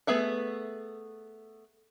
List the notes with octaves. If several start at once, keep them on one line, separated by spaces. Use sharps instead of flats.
A3 B3 G#4 E5 F#5